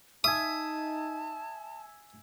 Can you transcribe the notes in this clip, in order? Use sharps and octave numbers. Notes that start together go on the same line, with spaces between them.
D#4 E5 G#5 A5 D#6